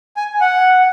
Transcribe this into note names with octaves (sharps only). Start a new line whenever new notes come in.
G#5
F#5